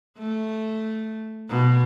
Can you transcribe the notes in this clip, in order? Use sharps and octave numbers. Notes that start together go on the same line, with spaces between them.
A3
B2